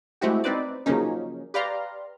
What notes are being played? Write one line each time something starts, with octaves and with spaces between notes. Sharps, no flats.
G#3 A3 C4 E4 F#4 G4
C4 D#4 B4 C5 D5
C#3 F3 F#3 A#3 C#4 D#4
G4 B4 D5 F5 A#5 C6